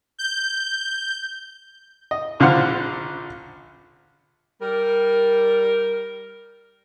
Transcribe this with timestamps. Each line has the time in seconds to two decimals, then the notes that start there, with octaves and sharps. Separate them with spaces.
0.19 G6
2.11 D#5
2.40 A#1 D3 F3 C5 F#5 F6
4.60 G3 A#4